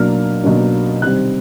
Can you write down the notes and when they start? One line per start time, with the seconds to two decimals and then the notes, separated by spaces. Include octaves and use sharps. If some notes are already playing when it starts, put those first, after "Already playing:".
Already playing: B2 F#3 A#3 D4 F6
0.44 B2 F#3 A#3 D4
1.02 C3 D#3 G3 C4 F#6